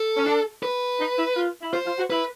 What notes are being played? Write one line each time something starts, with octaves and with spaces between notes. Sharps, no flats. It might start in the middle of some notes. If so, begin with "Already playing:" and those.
Already playing: A4
C#4
D4
B4
D#4
E4
F4
E4
F4 C5
F4
F#4
E4 B4